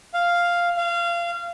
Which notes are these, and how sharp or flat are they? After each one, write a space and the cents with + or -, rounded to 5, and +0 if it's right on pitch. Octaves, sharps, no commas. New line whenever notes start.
F5 -5
F5 -25